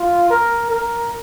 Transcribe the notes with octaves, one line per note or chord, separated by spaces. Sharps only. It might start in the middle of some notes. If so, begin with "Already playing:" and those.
Already playing: F4
A#4
A#4